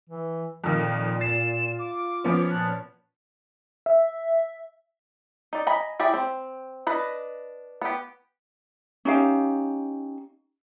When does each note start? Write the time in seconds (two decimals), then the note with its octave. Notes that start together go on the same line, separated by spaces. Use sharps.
0.09 E3
0.64 F2 A#2 D#3 A#3 F4
1.21 A6 C7 E7
1.79 D6
2.24 F3 B3 C#4
2.50 A#2 A5 F#6
3.86 E5
5.53 D#4 D5
5.67 D#5 G#5 A#5 B5
6.00 E4 G4 G#4 D5
6.14 C4
6.87 D4 B4 D#5
7.81 B3 G4
9.05 C#4 D#4 G4 F5